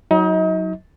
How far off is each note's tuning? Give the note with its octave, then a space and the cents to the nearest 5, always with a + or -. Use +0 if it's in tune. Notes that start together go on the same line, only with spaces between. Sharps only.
F#3 +0 D#4 +35 D#5 +40